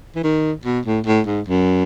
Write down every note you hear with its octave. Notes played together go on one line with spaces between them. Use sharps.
E3
D#3
B2
A2
A2
G#2
F#2